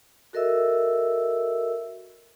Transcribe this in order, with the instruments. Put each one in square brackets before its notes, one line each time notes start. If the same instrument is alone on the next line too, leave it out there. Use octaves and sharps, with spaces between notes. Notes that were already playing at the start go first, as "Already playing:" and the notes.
[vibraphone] F#4 A4 A#4 D#5 E5 E6